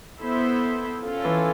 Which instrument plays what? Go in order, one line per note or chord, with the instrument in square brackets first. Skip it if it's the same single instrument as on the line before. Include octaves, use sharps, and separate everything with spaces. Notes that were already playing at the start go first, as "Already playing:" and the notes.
[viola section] B3 E4 A4 C5 E5
C#4 F4 A4
[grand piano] E3